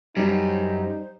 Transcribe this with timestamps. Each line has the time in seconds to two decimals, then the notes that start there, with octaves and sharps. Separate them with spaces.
0.17 F#2 G3 D#4 C5